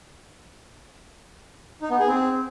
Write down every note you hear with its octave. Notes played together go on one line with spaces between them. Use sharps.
D#4
B3
G#4
C4